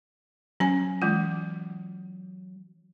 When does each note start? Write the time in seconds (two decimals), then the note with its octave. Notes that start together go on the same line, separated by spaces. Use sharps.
0.60 F#3 C#4 G#5
1.02 E3 G#3 F4